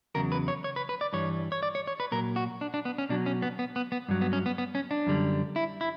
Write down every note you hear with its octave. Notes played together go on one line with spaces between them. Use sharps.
E2 C#3 F#3 A#4
B4
C#5
C#5
B4
B4
D5
G2 E3 G3 C#5
C#5
D5
C#5
C#5
B4
A#2 F#3 A#4
F#4
D4
D4
B3
C#4
B2 F#3 D4
C#4
B3
B3
B3
B3
G2 F#3
B3
C#4
B3
B3
C#4
D4
F#2 D3 G3
E4
E4